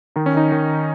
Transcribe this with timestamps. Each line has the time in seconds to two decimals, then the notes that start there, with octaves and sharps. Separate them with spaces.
0.16 D#3 D#4
0.26 C#4
0.34 D#3 D#4
0.52 D#3